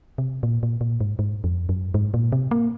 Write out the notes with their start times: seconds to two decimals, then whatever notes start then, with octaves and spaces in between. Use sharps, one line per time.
0.18 C3
0.43 A#2
0.63 A#2
0.81 A#2
1.01 G#2
1.19 G#2
1.44 F2
1.69 F#2
1.94 G#2
2.14 A#2
2.32 C3
2.51 A#3